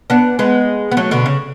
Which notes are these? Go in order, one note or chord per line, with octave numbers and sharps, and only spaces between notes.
B3 D4
G#3 B3
B3
F#3 A3
B2 D3
C#3